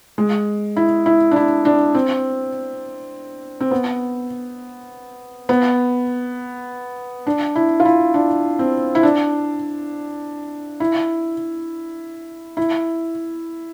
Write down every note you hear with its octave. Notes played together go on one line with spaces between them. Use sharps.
G#3
E4
E4
D4
E4
D4
C4
C4
B3
B3
D4
E4
F4
E4
D4
C4
E4
D4
E4
E4